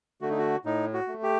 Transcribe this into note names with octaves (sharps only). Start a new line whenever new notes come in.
D3 A3 F#4
D#4
F#4
A2 D#4
F#4
A3
G4